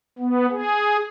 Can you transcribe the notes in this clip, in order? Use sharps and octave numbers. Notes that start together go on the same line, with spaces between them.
B3
G#4